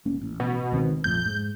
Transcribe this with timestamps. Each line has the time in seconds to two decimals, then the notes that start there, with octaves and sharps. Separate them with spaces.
0.05 E1 A#3 C#4
0.21 A1
0.40 B2
0.72 C#2 D#3 C4
1.04 A#1 F2 A2 G6
1.26 G#2